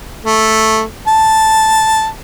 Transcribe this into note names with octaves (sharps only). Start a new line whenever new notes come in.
A3
A5